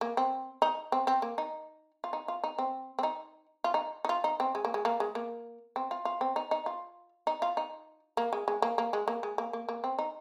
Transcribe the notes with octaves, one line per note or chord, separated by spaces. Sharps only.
A#3
C4
D#4
C4
C4
A#3
D#4
F4
D#4
F4
D#4
C4
C4
D#4
F4
D#4
D#4
F4
D#4
C4
G#3
A#3
G#3
A#3
G#3
A#3
C4
F4
F4
C4
D#4
D#4
F4
D#4
F4
D#4
A#3
G#3
G#3
A#3
A#3
G#3
A#3
G#3
A#3
A#3
A#3
C4
D#4